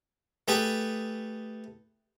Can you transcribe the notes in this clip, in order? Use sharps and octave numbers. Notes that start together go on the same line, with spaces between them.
A3 G4 G#4 B4